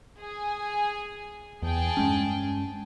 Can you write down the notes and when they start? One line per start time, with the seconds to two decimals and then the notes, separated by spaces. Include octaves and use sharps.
0.19 G#4 G#5
1.62 E2 G#4 G5 A5
1.97 G2 G#3 C#4